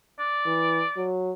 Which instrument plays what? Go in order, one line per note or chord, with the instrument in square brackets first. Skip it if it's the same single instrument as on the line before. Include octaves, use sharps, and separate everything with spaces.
[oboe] D5
[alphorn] E3
F#3